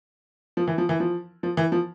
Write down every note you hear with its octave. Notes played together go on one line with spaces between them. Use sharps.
F3
E3
F3
E3
F3
F3
E3
F3